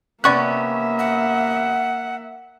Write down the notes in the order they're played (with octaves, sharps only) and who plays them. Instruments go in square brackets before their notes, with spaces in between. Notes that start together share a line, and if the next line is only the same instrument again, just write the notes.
[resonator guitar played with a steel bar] C3 B3 C#4 [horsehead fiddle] A#3 E5 [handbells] D5 C#6 F#6
[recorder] F#5